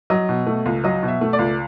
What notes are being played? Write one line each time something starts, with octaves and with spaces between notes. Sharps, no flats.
F#3 D#5
B2
A3
C#2
F#3 D#5
B2
E5
A3
D5
C#2